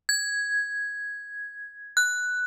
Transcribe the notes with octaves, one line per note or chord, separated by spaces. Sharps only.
G#6
F#6